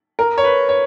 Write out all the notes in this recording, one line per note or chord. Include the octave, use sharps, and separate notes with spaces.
A#4
C#5
B4
C#5